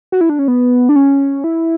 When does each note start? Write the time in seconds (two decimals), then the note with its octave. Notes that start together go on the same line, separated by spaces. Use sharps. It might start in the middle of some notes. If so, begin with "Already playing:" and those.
0.12 F#4
0.21 E4
0.29 D4
0.39 C#4
0.48 B3
0.89 D4
0.96 C#4
1.44 E4